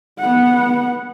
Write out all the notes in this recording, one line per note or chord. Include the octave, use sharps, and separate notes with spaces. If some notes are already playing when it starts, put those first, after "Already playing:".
B3 F#5